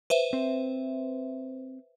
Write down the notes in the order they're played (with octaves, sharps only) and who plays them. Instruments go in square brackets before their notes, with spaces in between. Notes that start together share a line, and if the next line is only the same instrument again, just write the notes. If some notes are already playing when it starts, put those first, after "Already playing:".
[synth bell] B4 C5 E5
[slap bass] C4